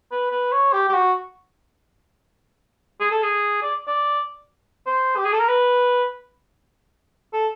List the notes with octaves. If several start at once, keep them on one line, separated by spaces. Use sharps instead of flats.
B4
B4
C#5
G4
G4
F#4
G#4
A4
G#4
D5
D5
C5
G4
G#4
A4
A#4
B4
A4